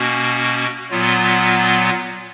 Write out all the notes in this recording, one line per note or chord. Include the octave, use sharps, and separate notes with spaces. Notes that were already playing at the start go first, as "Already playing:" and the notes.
Already playing: B2 A#3 C#4 F#4
A#2 F#3 B3 F4